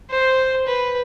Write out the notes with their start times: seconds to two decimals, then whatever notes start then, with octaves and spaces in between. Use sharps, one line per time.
0.10 C5
0.67 B4